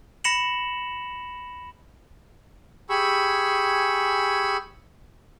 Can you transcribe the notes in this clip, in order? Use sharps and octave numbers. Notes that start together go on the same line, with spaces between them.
B5 A#6 C#7 E7 F#7
G4 G#4 G#5 B5 C#6 E6